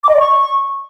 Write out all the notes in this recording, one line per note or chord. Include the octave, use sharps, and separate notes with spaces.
D6
D#5
D5
C#6